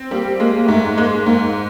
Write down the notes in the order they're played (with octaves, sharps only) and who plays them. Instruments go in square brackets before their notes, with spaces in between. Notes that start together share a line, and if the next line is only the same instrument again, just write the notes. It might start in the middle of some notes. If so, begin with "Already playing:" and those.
Already playing: [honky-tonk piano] C4
[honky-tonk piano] G3 [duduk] A#3
[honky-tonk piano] G#3 [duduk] A#3
[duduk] A#3
[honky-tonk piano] G#2 [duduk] A3
[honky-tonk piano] G#3 [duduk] A#3
[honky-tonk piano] G#2 [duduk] A#3